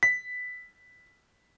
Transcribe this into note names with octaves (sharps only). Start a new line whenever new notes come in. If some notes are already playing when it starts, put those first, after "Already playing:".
B6